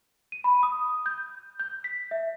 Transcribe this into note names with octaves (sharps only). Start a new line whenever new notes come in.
D#7
B5
D#6
G6
G6
B6
E5